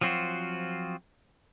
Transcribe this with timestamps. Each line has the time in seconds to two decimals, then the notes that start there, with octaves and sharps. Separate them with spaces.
0.01 F3 F#3 C4 F4 F#4